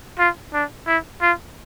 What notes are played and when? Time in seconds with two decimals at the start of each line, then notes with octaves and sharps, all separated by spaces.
0.19 F4
0.54 D4
0.87 E4
1.22 F4